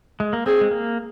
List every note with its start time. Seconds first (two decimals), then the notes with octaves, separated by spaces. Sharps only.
0.20 G#3
0.33 A#3
0.46 C4 G#4
0.61 G#3
0.71 A#3